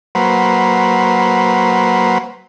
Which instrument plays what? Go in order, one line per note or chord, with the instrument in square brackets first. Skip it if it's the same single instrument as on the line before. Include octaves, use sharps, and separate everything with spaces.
[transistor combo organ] F#3 A#3 B4 C5